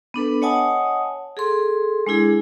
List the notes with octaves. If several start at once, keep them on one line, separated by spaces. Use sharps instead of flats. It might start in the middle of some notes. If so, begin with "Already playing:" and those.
B3 D4 A4 B4
C#5 D#5 F#5 G#5 A5 D#6
G#4 A4 C6
G#3 D4 E4 G#4